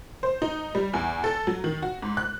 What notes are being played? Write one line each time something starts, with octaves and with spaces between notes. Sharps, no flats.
C5
D#4
G3
E2
A4
F#3
D#3
F#4
G#2
F#6